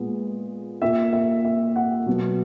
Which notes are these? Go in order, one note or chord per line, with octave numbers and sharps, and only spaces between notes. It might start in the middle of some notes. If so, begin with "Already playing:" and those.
Already playing: A#2 G#3 B3
A#2 A#3 E5
E5
E5
F#5
B2 F#3 B3